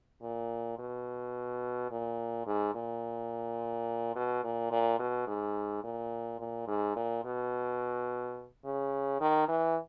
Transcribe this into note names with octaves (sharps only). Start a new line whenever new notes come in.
A#2
B2
A#2
G#2
A#2
B2
A#2
A#2
B2
G#2
A#2
A#2
G#2
A#2
B2
C#3
D#3
E3